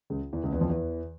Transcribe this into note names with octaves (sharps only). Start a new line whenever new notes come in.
C#2 C#3
E2 E3
C#2 C#3
E2 E3
F2 F3
E2 E3